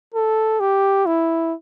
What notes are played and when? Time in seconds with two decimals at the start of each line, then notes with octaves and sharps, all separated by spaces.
0.14 A4
0.60 G4
1.06 E4